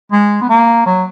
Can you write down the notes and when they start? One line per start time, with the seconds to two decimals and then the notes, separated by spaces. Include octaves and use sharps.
0.12 G#3
0.42 B3
0.49 A#3
0.86 F#3